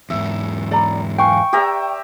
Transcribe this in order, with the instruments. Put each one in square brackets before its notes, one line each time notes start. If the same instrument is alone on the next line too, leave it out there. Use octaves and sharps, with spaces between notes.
[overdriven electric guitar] E2 G#2 [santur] E5
[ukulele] D5 A#5 B5
[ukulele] B4 F5 G#5 [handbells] G5 C#6
[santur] G4 E5 A#5 [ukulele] B4 D5